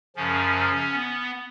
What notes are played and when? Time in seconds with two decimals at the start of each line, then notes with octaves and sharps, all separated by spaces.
0.16 F#2 C#3 F3 C#4
0.92 B3